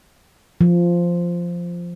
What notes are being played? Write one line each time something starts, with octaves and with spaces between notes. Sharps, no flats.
F3